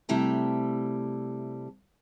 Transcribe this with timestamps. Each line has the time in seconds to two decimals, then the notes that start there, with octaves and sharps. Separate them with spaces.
0.09 C3 G3 A3 E4 G5 A#5